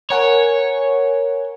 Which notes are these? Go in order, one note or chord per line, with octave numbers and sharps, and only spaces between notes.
A#4 C#5 F#5 G#5